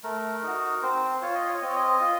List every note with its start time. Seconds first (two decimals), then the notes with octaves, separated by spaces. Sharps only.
0.04 A3 A#4
0.43 D#4 F#4
0.82 C4 C5
1.22 F4 C#5
1.35 D#5
1.47 C#5
1.62 C4 D#5
1.69 C#5
1.76 D#5
2.01 F4